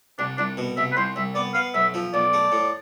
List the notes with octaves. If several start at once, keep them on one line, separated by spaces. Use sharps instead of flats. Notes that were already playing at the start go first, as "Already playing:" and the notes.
C2 D4
C2 D4
B2
C2 E5
B4
C2 C5
C2 E5
B3 D5
B3 F5
B1 E5
F3
B1 D5
A3
A2